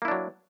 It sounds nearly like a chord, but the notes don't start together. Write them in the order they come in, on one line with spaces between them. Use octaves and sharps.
A#3 E4 D4 F#3